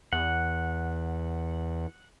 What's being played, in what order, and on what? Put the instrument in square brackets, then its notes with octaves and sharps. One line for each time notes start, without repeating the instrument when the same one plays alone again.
[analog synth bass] E2 [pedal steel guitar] F#5